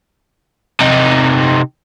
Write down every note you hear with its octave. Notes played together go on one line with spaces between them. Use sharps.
C3 D#4